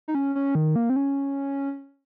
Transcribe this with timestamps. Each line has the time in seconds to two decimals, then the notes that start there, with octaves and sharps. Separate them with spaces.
0.08 D#4
0.15 C#4
0.35 C#4
0.55 D#3
0.76 A#3
0.90 C4
0.96 C#4